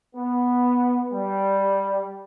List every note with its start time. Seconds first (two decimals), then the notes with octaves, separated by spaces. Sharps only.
0.15 B3
1.12 G3